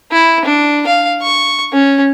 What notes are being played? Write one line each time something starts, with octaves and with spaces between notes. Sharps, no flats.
E4
D4
F5
C#6
C#4